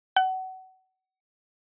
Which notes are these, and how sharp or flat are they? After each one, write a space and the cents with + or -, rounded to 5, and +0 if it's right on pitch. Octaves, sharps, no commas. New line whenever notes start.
F#5 +25